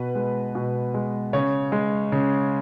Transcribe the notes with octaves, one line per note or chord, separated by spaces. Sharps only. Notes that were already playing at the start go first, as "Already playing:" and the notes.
Already playing: B2 B4
G#3
B2
G#3
C#3 C#5
G#3
C#3